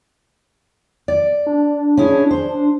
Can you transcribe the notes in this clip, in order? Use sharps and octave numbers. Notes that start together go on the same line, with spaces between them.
D5
D4
C#4 E4 G#4
C5